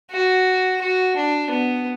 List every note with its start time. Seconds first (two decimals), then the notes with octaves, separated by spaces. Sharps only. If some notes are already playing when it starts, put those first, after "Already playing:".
0.11 F#4
0.81 F#4
1.16 D4
1.50 B3